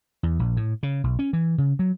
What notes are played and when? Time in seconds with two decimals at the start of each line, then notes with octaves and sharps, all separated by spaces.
0.23 E2
0.39 A#1
0.57 A2
0.83 C#3
1.04 B1
1.19 C#4
1.33 E3
1.58 C#3
1.79 F#3